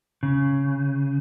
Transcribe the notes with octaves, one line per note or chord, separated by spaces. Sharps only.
C#3